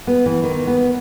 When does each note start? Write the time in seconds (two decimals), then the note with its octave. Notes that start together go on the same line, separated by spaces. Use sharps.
0.07 B3
0.26 E3
0.43 D#3
0.67 B3